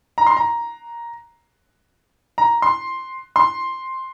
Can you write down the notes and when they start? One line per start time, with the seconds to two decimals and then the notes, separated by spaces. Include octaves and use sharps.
0.18 A#5
0.27 C6
0.37 A#5
2.38 A#5
2.62 C6
3.36 C6